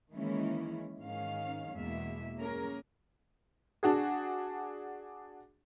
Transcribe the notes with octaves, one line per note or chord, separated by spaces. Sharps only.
D#3 E3 G#3 A#3 C#4 E4
G#2 D#3 C#4 F5
E2 B2 G#3 A#3 E5
A#3 C#4 G#4 A#4
D4 F#4 G#4